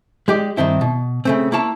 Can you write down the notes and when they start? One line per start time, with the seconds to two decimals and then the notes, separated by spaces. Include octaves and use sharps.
0.28 G#3 G4 D5
0.57 G2 D#3 C4 E4
0.81 B2
1.25 C#3 A3 C4
1.52 A#3 E4 C#5 A5